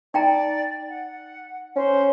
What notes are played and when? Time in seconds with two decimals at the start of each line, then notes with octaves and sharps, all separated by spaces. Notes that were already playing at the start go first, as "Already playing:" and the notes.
0.14 D#4 D5 G5 A#5
0.89 F#5
1.76 C#4 C5